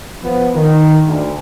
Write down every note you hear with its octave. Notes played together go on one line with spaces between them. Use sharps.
F3 B3
D#3
D2